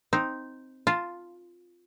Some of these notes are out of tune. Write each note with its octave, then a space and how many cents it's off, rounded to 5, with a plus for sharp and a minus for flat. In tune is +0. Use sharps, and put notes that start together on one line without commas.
C4 +0 D#4 +0
F4 +0 A5 +5